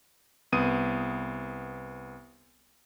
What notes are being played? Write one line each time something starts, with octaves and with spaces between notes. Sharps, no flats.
C2 B3 D#6 D#7